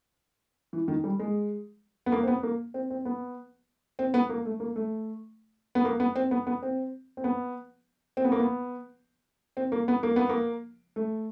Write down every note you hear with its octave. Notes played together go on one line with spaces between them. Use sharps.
E3
D#3
G3
G#3
B3
A#3
C4
B3
A#3
C4
C4
B3
C4
B3
A#3
A3
A#3
A3
B3
A#3
B3
C4
B3
B3
C4
C4
B3
C4
B3
A#3
B3
C4
A#3
B3
A#3
B3
A#3
A3